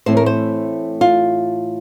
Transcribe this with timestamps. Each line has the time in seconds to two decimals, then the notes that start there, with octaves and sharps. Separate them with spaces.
0.06 A2 E3 A3 C4 C5
0.17 A#4
0.26 C5
1.01 F4